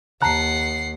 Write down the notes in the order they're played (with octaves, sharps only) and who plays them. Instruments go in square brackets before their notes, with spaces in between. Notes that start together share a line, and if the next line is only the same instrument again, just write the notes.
[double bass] D#2 [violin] F#5 C7 [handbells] A5 A#5 F#6